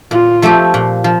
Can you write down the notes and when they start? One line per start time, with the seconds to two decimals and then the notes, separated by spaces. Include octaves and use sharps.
0.11 A#2 F4
0.42 F3 A3 C4 G4
0.74 A#2
1.04 F3